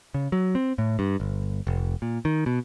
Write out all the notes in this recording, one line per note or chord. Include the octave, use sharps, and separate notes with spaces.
C#3
F#3
C4
A2
G2
G1
F1
A#2
D#3
B2